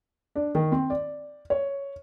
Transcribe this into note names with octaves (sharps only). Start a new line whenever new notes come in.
D4
D#3
C4
D5
C#5